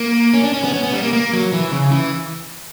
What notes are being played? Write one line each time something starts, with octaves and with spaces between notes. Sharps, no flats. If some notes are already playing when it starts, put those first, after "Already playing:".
Already playing: A#3
C#4
D4
C#4
B3
C#4
B3
G3
A#3
A#3
F#3
E3
C#3
E3